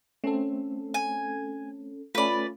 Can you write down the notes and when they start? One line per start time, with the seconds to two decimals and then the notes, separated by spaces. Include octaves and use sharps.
0.24 A3 C4 C#4 A4
0.94 G#5
2.15 A3 C#4 F4 B4 D5